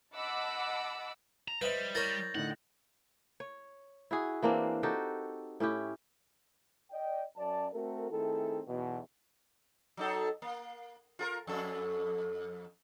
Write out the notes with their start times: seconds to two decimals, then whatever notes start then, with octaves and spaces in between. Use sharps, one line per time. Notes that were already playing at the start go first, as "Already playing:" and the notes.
0.15 D#5 F#5 A5 B5 D6 E6
1.48 A#5
1.62 G3 B4 C5 D#5 E5 B5
1.95 E4 A#4 C#5 G6 A6 A#6
2.35 A2 D3 D#4 F#5
3.40 C#5
4.11 E4 F#4 G#4
4.43 E3 A#3 C4 D4
4.83 D#4 F#4 G4 A4
5.60 A2 C#4 E4 G4
6.91 D5 D#5 G5
7.37 F#2 D5 A5
7.73 A3 C4 F#4 A4 A#4
8.11 D#3 A3 C4 E4 G#4 A4
8.68 B1 E2 B2
9.97 F#3 D#4 A4
10.42 A#3
11.19 F4 G#4 A#4
11.47 F2 A4